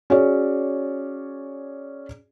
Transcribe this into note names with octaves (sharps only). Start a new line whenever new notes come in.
C#4 F#4 G#4 C#5 D5